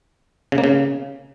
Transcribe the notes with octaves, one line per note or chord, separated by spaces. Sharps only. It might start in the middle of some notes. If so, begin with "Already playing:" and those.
C#3
A#3
C#3